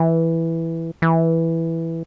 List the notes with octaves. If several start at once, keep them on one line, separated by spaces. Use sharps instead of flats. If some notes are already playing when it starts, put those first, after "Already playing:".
Already playing: E3
E3